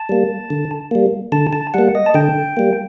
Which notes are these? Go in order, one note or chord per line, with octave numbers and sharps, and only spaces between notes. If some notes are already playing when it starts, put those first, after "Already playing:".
Already playing: A5
G3 A#3
D3
G3 A#3
D3 A5
A5
G3 A#3 F#5
D#5
A5
D3 G5
G3 A#3